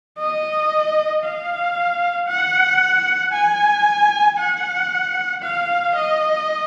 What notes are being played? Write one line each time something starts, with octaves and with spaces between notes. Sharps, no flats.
D#5
F5
F#5
G#5
F#5
F5
D#5